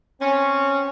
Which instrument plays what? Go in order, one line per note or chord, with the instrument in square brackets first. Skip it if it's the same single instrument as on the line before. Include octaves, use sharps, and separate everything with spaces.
[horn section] C4 C#4